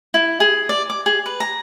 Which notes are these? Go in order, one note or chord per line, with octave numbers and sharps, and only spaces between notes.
E4
G#4
D5
D6
G#4
B4
A#5